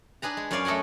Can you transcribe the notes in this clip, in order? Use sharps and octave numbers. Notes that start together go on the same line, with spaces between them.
D4 G#4 B4 A#5
G#3
F#2 C#4 C#5 D5 F5 G#5
A3 A4 D#5 F#5 G#5